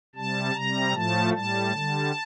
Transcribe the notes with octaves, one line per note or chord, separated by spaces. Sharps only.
C3 G3 A5
C3 G3 A#5
A2 F3 A3 A5
A2 G3 A5
D3 G3